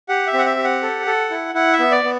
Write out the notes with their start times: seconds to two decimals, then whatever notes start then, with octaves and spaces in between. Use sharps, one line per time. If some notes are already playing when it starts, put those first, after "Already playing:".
0.09 G4 F#5
0.27 E5
0.33 C4
0.38 F#5
0.46 E5
0.57 G4
0.64 F#5
0.83 A4
1.06 A4
1.30 E4
1.54 E4 F#5
1.73 E5
1.79 B3
1.91 D5
2.04 B3